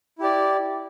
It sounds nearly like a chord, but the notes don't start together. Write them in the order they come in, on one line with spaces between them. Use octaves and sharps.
E4 G4 D5